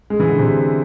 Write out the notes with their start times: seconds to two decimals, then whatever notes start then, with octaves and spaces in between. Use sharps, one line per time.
0.10 G#3
0.20 E3
0.29 D3
0.39 C3